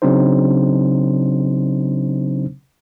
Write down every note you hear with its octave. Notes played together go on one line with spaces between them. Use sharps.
C#3 F#3 C4 D4 D#4 C5